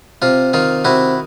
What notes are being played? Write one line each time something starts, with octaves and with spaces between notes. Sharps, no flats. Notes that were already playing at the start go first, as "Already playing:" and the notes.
C3 F4
D#3 F4
C3 E4 F#4